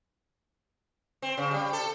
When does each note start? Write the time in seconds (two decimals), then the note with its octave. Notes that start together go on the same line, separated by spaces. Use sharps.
1.22 C4
1.37 C#3
1.51 G3
1.73 A4